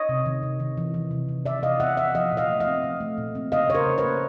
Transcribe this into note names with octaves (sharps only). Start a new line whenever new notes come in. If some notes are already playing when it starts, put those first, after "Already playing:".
Already playing: C#5 D#5
C3
D#3
C3
D#3
E3
E3
C3
C3
E3 D5 E5
C3 D#5 F5
B3 E5 F#5
E3 E5 F#5
F3 D#5 F5
A#2
D#5 F5
A3
D#5 F5
C4
F3
A3
A#2
C4
C#3 D#5 F5
C#3 C#5
A#4 C5
C#3
B4 C#5
A#3